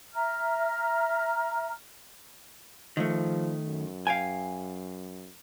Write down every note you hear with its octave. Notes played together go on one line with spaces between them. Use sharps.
E5 A#5 F6
D#3 F3 A3
F#2
F5 G5 G#5